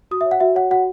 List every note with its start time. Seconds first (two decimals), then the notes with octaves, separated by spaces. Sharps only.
0.11 F#4 D#6
0.21 E5
0.26 C#5
0.31 F#5
0.40 F#4 E5
0.55 C#5 F#5
0.71 F#4 F#5